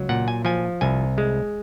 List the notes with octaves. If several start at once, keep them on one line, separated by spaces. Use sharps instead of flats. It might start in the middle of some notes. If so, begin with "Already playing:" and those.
Already playing: C#2 F#3
A#2 F#5
G#5
F3 G#5
C2 G#5
G#3